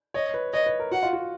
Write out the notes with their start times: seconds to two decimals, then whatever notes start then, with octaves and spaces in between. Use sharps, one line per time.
0.14 C#5 D#5
0.34 B4
0.53 C#5 D#5
0.66 B4
0.79 A#4
0.92 F#4 F#5
1.03 F4
1.13 F#4